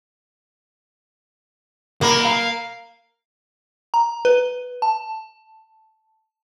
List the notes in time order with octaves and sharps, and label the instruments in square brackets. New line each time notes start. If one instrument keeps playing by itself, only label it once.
[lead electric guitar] B1 B5 [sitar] A#3
[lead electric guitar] F5
[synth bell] A#5
B4
A5